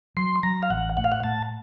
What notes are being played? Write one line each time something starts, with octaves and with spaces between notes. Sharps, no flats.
F#3 C6
F#3 A#5
F5
A1 F#5
A2 F#5
F5
F#5
A2 A5